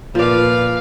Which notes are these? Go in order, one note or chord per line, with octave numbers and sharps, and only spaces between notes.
A#2 F3 B4 D5 F5